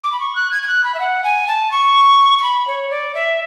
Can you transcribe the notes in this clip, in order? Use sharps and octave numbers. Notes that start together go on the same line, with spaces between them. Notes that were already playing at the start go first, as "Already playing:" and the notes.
D6
B5
C#6
F#6
G#6
G#6
F#6
B5
E5
F#5
G#5
A5
C#6
C#6
B5
C#5
D5
E5